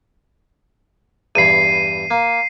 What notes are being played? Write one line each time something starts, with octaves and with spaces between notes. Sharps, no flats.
E2 G2 B5 C7 D#7
A#3